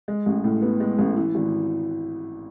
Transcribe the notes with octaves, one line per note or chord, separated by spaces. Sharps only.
G#3
A1
A2
B3
G#3
A1
E3
G#1